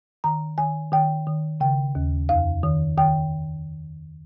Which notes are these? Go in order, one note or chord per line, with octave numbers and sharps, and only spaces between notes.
D#3 A#5
D#3 G#5
D#3 G5
D#3
C#3 G5
D#2
F2 F5
D#3
D#3 G5